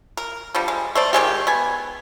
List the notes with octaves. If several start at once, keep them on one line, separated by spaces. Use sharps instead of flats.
A#4
D3 F3 G3
G#3
A3 C5 D5
D#3 F#3 G#3 G4
B3 G#5